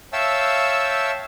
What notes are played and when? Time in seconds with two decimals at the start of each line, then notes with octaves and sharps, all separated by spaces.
0.13 C#5 E5 F5 G5 A5 E6